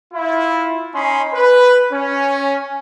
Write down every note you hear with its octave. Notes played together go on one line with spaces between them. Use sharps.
E4 F4
C#4 D#4 D#5 B5 C6
B4
C#4